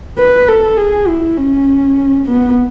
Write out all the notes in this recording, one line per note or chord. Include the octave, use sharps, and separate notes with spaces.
B4
A4
G#4
E4
C#4
B3